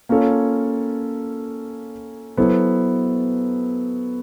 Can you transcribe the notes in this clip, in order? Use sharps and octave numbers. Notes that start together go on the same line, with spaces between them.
A#3 C#4 F4 A4 C#5
F#3 B3 E4 A4 C5